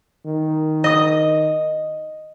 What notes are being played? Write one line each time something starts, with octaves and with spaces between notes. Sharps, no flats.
D#3
D#5 D#6